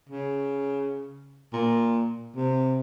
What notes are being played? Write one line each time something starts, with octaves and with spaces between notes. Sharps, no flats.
C#3
A#2
C3